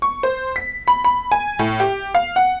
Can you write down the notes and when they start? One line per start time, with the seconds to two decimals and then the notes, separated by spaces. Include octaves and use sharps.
0.02 C#6
0.23 C5
0.56 B6
0.88 B5
1.04 B5
1.32 G#5
1.59 A2
1.80 G4
2.15 F5
2.36 F#5